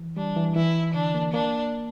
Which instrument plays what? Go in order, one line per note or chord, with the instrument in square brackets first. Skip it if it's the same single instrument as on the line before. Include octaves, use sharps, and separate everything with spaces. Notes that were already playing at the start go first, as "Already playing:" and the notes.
Already playing: [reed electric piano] E3
[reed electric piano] G3 [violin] D4
[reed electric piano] E3
[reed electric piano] E3 [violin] E4
[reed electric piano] D3 [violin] D4
[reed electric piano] A#3
[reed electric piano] A#3 [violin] D4